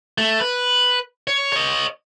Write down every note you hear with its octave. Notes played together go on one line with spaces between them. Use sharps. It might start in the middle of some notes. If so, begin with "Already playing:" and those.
A3
B4
C#5
C#5 D#5